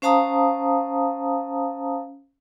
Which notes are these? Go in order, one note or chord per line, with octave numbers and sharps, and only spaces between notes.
C#4 C5 F5 A5 A#5 D#6